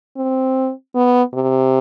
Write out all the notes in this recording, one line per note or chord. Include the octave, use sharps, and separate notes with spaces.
C4
B3
C3